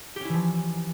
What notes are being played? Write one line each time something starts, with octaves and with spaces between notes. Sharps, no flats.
E3 F3 C#4 E4 G4